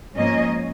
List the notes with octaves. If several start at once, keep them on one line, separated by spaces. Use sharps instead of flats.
G#2 F3 A#3 C#4 D#5